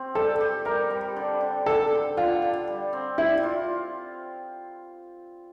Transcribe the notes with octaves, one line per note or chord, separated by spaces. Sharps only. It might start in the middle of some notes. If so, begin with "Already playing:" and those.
Already playing: C4 G4
G3 A4
G4
G3 A#4
G3
D3
D3
D3 A4
D3
D3 F4
D3
G3
C4
G3 E4
F4